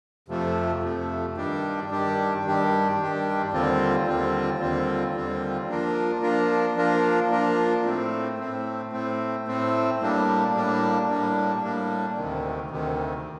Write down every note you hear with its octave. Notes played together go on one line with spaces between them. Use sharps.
F2 C3 F3 A3
F2 C3 F3 A3
G2 D#3 G3 D4 G4
G2 D#3 G3 D4 G4
G2 D#3 G3 D4 G4
G2 D#3 G3 D4 G4
D#2 D3 G3 C4 F4
D#2 D3 G3 C4 F4
D#2 D3 G3 C4 F4
D#2 D3 G3 C4 F4
F3 A#3 D4 F4 A#4
F3 A#3 D4 F4 A#4
F3 A#3 D4 F4 A#4
F3 A#3 D4 F4 A#4
A2 A3 C4
A2 A3 C4
A2 A3 C4
A2 A3 C4
A2 G3 A#3 D4
A2 G3 A#3 D4
A2 G3 A#3 D4
A2 G3 A#3 D4
D2 C3 D#3
D2 C3 D#3